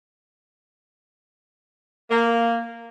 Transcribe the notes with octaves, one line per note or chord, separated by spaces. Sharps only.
A#3